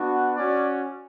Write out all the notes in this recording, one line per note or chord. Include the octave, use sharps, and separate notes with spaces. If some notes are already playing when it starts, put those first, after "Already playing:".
Already playing: B3 D4 F#4
C#4 F#4 D5